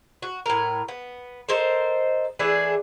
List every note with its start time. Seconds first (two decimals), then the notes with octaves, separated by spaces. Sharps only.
0.22 F#4
0.46 A2 A#4
0.88 B3
1.49 A4 A#4 C5 D#5
2.39 E3 A3 D4 G#4